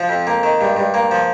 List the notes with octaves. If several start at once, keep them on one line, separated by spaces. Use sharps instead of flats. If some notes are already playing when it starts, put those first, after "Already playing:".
Already playing: F3 F4
F2
A#3
D#3
G2
G2
A#3
F3